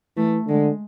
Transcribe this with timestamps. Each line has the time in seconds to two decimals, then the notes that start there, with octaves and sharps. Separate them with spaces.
0.17 E3 A3
0.48 D3 G#3